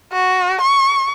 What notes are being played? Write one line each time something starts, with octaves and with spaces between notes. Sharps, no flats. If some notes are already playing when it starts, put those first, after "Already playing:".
F#4
C#6